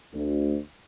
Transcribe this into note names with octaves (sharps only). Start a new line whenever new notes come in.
D2